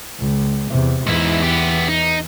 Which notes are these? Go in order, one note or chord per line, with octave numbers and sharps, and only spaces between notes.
C#2
E2 C3
E2 G#2 E3 E4
B3 G4
D#4